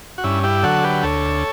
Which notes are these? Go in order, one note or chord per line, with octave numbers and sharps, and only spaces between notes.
F#4
G2 C#4 E4
E4 G4
D3 F#3 F#4 A4
G4 B4
D2 A4 C#5